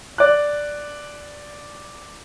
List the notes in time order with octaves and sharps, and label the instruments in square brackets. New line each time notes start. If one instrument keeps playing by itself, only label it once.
[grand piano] D5 F#6